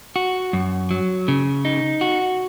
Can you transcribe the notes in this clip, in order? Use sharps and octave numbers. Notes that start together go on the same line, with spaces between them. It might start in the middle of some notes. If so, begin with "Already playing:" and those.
F#4
F#2
F#3
C#3
D#4
F#4